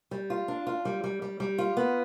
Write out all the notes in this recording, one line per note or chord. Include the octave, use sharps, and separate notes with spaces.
G3
F4
D4
F4
G3
G3
G3
G3
F4
B3